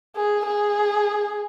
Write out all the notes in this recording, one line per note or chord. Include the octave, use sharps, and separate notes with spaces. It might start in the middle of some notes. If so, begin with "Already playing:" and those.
G#4
G#4